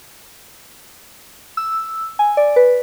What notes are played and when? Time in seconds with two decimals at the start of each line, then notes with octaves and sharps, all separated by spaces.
1.57 E6
2.19 G#5
2.37 D5
2.56 B4